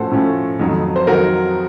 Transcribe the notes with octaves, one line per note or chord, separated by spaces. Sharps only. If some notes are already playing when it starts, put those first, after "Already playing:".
Already playing: A2 F3 A3 C#4 F#4 A4 C5
A2 F3 A3 C#4
F2 D#3 F#3
C5
F2 D#3 F#3 F#4 A#4